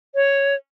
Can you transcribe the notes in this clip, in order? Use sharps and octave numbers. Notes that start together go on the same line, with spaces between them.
C#5